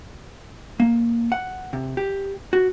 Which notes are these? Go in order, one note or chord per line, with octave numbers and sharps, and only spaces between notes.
A#3
F#5
C3
G4
F#4